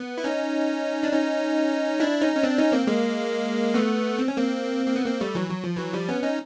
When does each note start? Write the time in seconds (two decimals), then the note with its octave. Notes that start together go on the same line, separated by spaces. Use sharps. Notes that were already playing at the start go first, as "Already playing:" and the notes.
Already playing: B3
0.18 E4
0.24 C#4 D#4
1.03 D4
1.12 C#4 D#4
2.00 D4 E4
2.21 C#4 D#4
2.35 C#4
2.43 C4 D4
2.58 C#4 D#4
2.72 A#3 C4
2.87 G#3 A#3
3.74 A3 B3
4.18 C4
4.28 C#4
4.37 A#3 C4
4.87 A#3
4.96 B3
5.06 A#3 C4
5.21 G3 A3
5.35 E3 F#3
5.50 F#3
5.64 F3
5.76 E3 F#3
5.93 F3 G3
6.08 B3 C#4
6.23 C#4 D#4